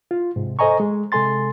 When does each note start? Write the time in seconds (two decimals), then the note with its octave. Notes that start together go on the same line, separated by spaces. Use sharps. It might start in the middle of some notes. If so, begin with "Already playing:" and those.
0.11 F4
0.36 G#2 C3
0.59 A4 C5 D#5 G#5 A#5 C#6
0.80 G#3
1.12 C3 G#3 A4 G#5 C6 A6